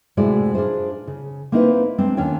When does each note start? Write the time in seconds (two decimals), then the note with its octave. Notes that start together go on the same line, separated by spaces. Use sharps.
0.17 A2 C3 G#3 E4 F#4 D5
0.54 D4 F4 G4 G#4 C5
1.07 C#3
1.52 A#3 C4 D#4 E4 A4 B4
1.98 G#3 C4 D4
2.17 D#2 C#4 D4 F4 C#5 G5